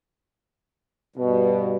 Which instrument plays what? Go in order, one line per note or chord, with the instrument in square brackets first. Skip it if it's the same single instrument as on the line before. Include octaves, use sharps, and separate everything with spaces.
[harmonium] G2 [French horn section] B2